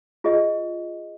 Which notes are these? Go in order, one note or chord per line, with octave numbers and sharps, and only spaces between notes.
F4 G#4 D#5